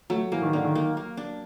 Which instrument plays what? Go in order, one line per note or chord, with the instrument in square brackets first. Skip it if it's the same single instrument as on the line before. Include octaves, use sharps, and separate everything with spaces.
[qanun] F#3 [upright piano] A3
[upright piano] E3 [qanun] A#3
[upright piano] D#3
[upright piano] D3 [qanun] A#3
[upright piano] D#3
[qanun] A#3
A#3
D4